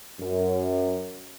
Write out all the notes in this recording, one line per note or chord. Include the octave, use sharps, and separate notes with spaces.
F#2